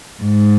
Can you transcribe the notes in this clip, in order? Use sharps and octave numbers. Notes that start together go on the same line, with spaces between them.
G#2